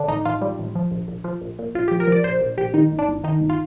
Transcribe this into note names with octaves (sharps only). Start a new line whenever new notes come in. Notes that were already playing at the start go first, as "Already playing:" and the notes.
Already playing: D3 D4
A1 D#4
A1 F4
G3
A1
F3
A#1
A#1
F3
A#1
A#2
A#1 F4
F3 G4
A#4
F3 D5
A#1 C5
A#1
A#1 G4
D#3 D#4
G1
D4
G1
D#3 D#4
G1
F4